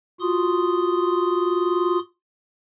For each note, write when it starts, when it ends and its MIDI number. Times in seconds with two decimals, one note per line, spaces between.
0.20 1.99 65
0.20 1.99 66
0.20 1.99 84
0.20 1.99 87